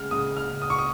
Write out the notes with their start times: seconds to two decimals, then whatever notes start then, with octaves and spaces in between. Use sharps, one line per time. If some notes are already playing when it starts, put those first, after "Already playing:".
Already playing: C#3 G#3 F6
0.11 C#3 D#6
0.37 F6
0.49 C#3
0.62 D#6
0.70 C#6
0.79 D#6